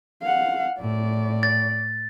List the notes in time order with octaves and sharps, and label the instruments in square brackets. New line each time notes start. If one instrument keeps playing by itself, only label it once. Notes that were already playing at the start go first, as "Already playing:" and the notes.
[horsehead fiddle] F5 F#5
[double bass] A2 [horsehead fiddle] D5
[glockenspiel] A6